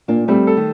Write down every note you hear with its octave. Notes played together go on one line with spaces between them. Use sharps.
A#2 A#3 D4
G3 A3 C4
A4
D#3 G3